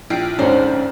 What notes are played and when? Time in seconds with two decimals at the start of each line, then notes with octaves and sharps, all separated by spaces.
0.10 A#1 E4 F4 G5 C7
0.39 D2 G#2 C#4 C5 D5